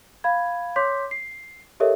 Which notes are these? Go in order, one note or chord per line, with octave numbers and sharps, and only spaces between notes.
F5 B5 G#6
C#5 C6 D6 G6 B6
C7
G4 A4 A#4 C#5 D#5 E5